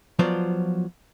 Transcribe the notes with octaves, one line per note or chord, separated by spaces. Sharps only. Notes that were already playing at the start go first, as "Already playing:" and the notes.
F3 F#3 B3 F4 C5 D5